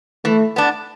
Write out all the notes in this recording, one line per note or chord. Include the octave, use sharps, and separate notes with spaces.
E3 A3
B3 D4